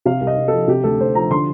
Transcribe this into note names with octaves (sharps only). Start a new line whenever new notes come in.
C3 F5
C2
D#5
C2
F3 A4
C3 G4
D2 A4
D2 C5
F3 A#5
D3 C6